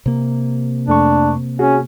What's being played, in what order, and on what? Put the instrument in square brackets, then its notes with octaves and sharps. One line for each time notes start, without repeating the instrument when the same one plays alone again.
[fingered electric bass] C3 A#3
[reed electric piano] F2 A3 C#6 [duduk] D4
[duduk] C#4 [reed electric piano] F#4 G#4